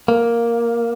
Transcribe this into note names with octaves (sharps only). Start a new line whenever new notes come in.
A#3